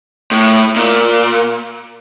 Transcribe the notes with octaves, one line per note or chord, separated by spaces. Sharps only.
A2
A#2